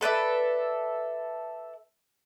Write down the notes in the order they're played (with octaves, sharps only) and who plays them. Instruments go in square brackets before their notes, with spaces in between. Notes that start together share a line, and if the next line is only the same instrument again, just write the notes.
[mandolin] A4 B4 D5 E5